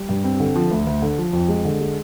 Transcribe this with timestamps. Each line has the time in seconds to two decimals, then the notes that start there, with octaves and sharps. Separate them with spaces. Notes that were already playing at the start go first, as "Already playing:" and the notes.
Already playing: G3
0.09 G2
0.24 C4
0.40 D3
0.55 F3
0.71 D2
0.87 D2
1.02 D3
1.18 F3
1.33 F2
1.49 G#3
1.65 D3
1.80 G#3